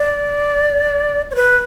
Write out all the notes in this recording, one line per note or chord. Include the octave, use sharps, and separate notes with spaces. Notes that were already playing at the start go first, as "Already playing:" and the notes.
Already playing: D5
C#5
B4